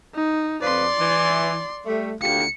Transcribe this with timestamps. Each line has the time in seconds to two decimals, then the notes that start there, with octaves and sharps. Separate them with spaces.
0.15 D#4
0.62 F2 F3 B4 D5 C6
1.00 E3
1.85 G3 A3
2.22 D2 F4 G4 C#7